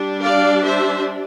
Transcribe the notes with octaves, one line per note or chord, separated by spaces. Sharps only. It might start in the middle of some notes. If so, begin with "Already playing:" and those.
Already playing: G3 D4
D5 F5
C5 E5